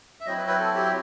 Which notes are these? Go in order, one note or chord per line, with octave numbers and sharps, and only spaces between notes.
E5
F#3 C4 E4 D#5
B4
B4
A4
G4